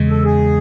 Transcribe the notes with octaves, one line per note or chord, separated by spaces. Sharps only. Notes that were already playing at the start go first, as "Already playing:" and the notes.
Already playing: E2 C#3 G#3
A4
G#4